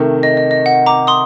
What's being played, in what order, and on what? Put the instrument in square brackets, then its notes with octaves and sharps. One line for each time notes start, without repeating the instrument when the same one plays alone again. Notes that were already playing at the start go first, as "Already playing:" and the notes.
Already playing: [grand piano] C3 D#3 A3
[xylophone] D#5
D#5
D#5
F#5
A#5 D6
C6 D#6